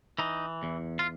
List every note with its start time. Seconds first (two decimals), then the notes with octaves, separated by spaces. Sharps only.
0.19 E3 D#4
0.63 E2
0.99 F4